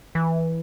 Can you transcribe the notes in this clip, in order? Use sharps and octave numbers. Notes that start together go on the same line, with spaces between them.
E3